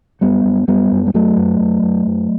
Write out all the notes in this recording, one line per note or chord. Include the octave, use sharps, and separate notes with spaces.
F#2 G3 B3
F#2
F#2 G3 B3
F#2
G3
F#2 F#3 A3
F#2
F#2
F#2
F#2